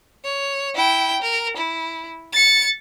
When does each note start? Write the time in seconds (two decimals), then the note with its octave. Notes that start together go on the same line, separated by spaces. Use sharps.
0.24 C#5
0.75 E4 G5
1.23 A#4
1.57 E4
2.33 A6 C#7